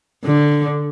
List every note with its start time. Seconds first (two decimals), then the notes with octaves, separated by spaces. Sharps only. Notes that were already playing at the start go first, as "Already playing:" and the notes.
0.24 D3